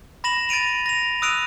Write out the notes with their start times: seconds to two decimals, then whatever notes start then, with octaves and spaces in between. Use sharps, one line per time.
0.24 B5 A#6 E7 F#7
0.49 A6 A#6 D7 D#7 F7
0.86 A#6 F7
1.22 D#6 E6 F#6 D7 D#7 F7